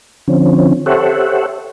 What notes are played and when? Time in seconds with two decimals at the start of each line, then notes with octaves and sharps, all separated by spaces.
0.28 D3 F3 C4 C#4
0.86 G4 A4 C5 C#5 E5 F#5